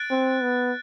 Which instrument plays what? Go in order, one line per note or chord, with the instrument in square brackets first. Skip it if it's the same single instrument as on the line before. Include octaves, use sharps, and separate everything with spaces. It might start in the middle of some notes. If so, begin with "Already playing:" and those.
Already playing: [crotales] F#6 A6 D7
[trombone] C4
B3